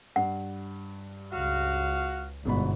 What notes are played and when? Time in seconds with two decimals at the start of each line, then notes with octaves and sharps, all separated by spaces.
0.16 G2 F#5
1.33 C#2 F#4 F5
2.45 G1 G#2 B2 B5